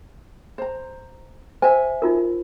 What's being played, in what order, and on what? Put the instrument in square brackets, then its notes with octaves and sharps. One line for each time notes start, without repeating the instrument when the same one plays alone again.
[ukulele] C5 A#5
[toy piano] C5 [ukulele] E5 G#5
[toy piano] D#4 F4 A#4